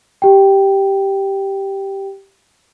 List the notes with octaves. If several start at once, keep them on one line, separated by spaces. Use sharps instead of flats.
G4 G5